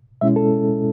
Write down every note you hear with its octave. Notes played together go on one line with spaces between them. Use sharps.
B2 G#3 C#4 E4 E5
A4